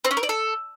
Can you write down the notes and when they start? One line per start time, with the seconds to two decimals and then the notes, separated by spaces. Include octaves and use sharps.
0.05 C4
0.11 C#4
0.17 A#4
0.23 D5
0.29 A4